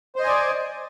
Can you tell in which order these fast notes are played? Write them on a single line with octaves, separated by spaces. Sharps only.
C5 D#5 G#5 D5